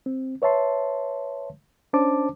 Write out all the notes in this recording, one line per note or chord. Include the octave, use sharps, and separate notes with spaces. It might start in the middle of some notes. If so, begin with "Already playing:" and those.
C4
B4 C#5 E5 A5 C6
C#4 D4 C5 A5 D6